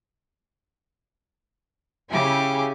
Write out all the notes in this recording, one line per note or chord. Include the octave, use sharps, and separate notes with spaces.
C#3 E4 G4 G#5 D6